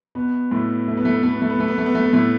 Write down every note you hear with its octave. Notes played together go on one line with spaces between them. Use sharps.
B2 B3
A2 A3
A3
B3
A3
B3
A3
B3
A3
B3
A3
B3
A3
B3
A3
B3
A2 A3